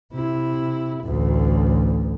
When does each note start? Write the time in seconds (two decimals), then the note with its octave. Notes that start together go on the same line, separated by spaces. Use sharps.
0.12 C3 E4
1.03 A1 D2